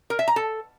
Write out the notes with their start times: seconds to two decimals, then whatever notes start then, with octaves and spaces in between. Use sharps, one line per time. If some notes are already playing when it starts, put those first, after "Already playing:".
0.10 A#4
0.19 E5
0.28 A#5
0.36 A4